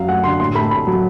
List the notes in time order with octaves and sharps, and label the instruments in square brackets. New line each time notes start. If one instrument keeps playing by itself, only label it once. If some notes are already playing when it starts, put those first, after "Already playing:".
Already playing: [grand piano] F#2 F#3 F5
A3 F#5
D3 C6
A2 C6
A3 B5
A2 B5
F#3